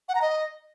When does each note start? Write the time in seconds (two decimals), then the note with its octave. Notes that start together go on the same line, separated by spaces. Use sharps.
0.09 F#5
0.15 A#5
0.22 D#5